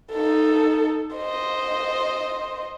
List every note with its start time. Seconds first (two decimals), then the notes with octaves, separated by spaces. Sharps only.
0.12 D#4 A4
1.16 C5 D#5